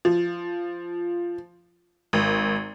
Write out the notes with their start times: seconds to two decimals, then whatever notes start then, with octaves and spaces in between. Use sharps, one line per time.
0.05 F3
2.13 G#1